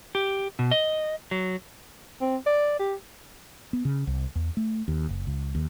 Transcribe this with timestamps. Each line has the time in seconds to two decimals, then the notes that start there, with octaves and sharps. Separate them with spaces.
0.15 G4
0.59 B2
0.71 D#5
1.31 F#3
2.21 C4
2.46 D5
2.79 G4
3.73 B3
3.85 C#3
4.07 C2
4.35 E2
4.57 A3
4.88 D#2
5.09 F#1
5.27 C#2
5.55 D#2